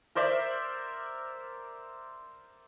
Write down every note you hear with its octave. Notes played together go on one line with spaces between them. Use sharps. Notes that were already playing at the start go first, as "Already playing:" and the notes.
A#4 C5 D5 E5